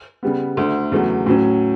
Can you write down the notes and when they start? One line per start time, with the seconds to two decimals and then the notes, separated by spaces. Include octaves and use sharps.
0.23 C#3 G3 B3
0.57 D2 D3 A3
0.92 E2 C#3 F#3 A3
1.26 A2 F#3 C#4